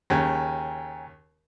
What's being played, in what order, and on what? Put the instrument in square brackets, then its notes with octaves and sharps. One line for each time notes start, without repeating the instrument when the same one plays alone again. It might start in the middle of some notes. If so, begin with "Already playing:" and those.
[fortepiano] D#2 C#3 [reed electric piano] G5 G#5 A#5